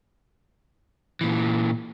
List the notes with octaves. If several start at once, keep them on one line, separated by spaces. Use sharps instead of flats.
A#2 E3